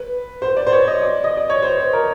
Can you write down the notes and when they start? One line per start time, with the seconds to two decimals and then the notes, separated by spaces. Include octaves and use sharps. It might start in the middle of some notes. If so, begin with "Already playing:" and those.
Already playing: B4
0.42 C5
0.57 D5
0.67 C5
0.72 C#5
0.87 D#5
1.02 D5
1.24 D#5
1.37 D5
1.50 C#5
1.62 C5
1.77 C5
1.93 A#4